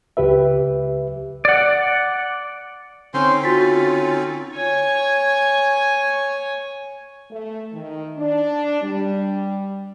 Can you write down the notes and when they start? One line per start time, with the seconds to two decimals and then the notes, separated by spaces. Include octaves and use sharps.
0.17 C#2 G4 B4 E5
1.45 D5 F#5
3.14 D3 C4 C#4 D#4 C5 C6
3.44 C#4 F4 F#4 A6 B6
4.55 C#5 G#5
7.31 A3
7.73 D#3
8.17 D4
8.82 G3